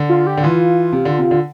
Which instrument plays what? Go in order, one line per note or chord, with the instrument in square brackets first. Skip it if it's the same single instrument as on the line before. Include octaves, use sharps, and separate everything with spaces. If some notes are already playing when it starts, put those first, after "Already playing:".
Already playing: [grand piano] D3
[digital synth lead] F4
G4
[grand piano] D3
[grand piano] E3 [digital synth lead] F4
[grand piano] C3
D3
C3
D3